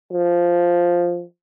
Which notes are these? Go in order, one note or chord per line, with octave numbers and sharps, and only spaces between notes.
F3